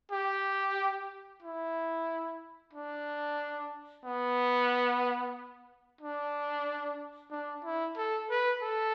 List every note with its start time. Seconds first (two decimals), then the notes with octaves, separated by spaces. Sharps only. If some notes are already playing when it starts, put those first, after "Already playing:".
0.11 G4
1.42 E4
2.73 D4
4.05 B3
6.01 D4
7.31 D4
7.64 E4
7.97 A4
8.30 B4
8.62 A4